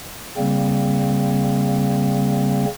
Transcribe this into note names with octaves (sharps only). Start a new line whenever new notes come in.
C#3 G3 A#3 C4